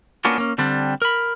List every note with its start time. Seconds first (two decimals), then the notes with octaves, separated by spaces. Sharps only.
0.25 A#3 B3 C#4 D4 F4 F#4
0.38 A#3 C#4
0.58 D3 G3 C4 D4
1.02 A#4 B5